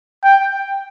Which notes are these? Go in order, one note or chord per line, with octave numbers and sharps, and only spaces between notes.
G5